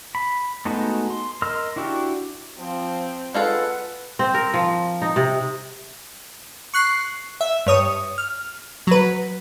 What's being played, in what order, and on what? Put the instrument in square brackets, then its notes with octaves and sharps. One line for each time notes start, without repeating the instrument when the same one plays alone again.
[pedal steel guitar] B5
G#3 A3 B3 D#4 F#4
C6
A#4 D#5 C6 E6 F6
D4 E4 F#4 G4
[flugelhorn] F3 [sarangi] C4
[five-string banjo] G#3 F4 A4 [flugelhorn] B4 [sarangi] F#5
[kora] C4
A#4
F3
D#4
C3
[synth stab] C#6 F#6 C7
E5
G2 C#5 D#6
F6
F#3 B4